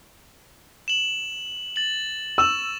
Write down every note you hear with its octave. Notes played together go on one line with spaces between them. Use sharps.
E7 F#7
A6 F#7
C#6 E6 E7 F#7